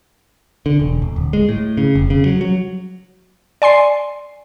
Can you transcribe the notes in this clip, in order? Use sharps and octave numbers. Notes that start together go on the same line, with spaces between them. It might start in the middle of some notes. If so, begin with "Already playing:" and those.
D3
E1
D#1
D1
G#3
A2
C#3
F1
C#3
F#3
F#3
D5 G#5 C6 C7